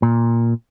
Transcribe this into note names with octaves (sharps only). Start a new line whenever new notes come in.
A#2